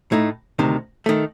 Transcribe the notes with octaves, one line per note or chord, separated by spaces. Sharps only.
A2 A3 D#4
D2 C3 D#3
D#3 A3